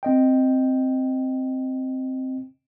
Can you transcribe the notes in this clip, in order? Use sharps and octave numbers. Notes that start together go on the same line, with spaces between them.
C4 D#5 G5